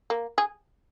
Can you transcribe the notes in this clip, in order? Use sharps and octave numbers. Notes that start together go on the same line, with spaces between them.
A#3
G#4